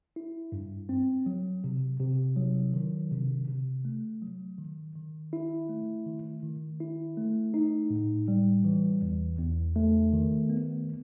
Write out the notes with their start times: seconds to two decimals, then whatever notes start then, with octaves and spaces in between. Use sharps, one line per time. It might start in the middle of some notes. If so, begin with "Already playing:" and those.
0.16 E4
0.52 G2
0.89 C4
1.26 F#3
1.64 C3
2.00 C3
2.37 F#3
2.74 D#3
3.12 C3
3.48 C3
3.85 A3
4.22 F#3
4.58 D#3
4.96 D#3
5.33 E4
5.69 A3
6.06 D#3
6.43 D#3
6.80 E4
7.17 A3
7.54 D#4
7.90 A2
8.28 G3
8.65 E3
9.02 E2
9.39 E2
9.76 A3
10.13 D#3
10.50 B3